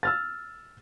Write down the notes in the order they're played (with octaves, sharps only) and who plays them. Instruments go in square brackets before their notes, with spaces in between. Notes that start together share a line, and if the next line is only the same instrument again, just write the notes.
[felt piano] E6 F6 A6